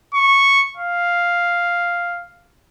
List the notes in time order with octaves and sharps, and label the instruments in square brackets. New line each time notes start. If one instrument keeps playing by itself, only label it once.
[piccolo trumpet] C#6
F5